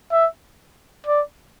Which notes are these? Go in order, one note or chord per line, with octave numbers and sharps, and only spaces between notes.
E5
D5